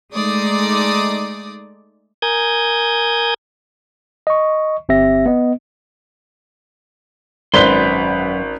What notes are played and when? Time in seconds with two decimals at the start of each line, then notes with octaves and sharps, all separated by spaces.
0.13 G#3 A3 D#4 D5 D6 D#6
2.22 A#4 G#5 D#6 G6 G#6
4.27 D#5 C#6
4.89 G1 C4 G4 E5 A#6
5.26 B3 D#5
7.54 G#1 F#2 C#4 B4 C5 D5 C6 G7